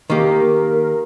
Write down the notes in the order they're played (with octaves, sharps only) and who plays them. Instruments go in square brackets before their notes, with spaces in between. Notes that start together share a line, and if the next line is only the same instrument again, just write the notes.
[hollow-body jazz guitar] D#3 A#3 G4 [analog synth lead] A#4